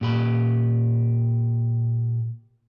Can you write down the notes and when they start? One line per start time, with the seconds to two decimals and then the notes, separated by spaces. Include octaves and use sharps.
0.01 A#2 G4 B5